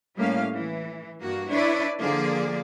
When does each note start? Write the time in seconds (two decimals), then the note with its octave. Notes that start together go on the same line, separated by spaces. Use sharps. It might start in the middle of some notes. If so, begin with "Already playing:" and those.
0.16 A2 G3 A#3 C#4 F5
0.54 E3
1.22 G2 A#3 F#4
1.51 D4 E4 B4 C#5 D5
1.99 D3 F3 A#3 G#4 D5